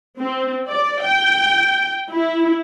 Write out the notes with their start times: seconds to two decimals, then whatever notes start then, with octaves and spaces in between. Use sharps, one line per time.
0.19 C4
0.68 D5
1.04 G5
2.10 E4